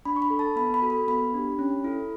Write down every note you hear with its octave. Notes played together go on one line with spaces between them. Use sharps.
D4 B5
C#6
B5
A4
A5
B3 B5
B5
F#4 A4
B5
B3 B5
D4 G4
C#4
E4 A4